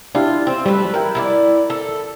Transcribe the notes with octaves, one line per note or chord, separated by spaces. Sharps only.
D4 E4 F4 G4
C4
G3 A3 B4
E4 A#4 G5
E4 F4 D5
A4